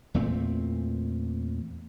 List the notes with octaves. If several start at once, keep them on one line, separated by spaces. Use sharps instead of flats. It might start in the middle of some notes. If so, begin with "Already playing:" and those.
E2 A#2 A3 C4